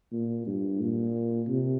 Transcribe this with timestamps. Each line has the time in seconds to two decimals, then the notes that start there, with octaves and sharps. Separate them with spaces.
0.12 A#2
0.47 G2
0.80 A#2
1.48 C3